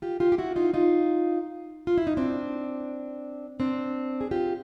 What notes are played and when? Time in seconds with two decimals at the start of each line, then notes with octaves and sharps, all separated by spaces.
0.02 F4 G4
0.20 F4 G4
0.32 G4
0.38 E4 F#4
0.56 D#4 F4
0.74 D#4 F4
1.87 F4
1.98 E4
2.07 D#4
2.17 C4 D4
3.60 C4 D4
4.21 G#4
4.31 F4 G4